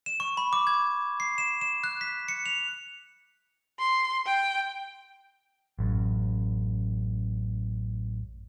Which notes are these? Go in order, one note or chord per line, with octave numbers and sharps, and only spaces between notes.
E7
C#6
B5
D6
G#6
C7
E7
E7
F#6
B6
C#7
F7
C6
G5
A1 F#2